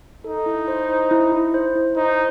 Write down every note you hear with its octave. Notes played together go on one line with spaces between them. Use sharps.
D#4 A4
E4
C5
C5
E4
E4
C5
E4
D#4 C5